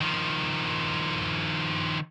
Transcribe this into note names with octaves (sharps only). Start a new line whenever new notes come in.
D#3 F3